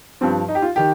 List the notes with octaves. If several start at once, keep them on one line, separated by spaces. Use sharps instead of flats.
G2 F3 C4
D#4
G4
F4
D#3 G4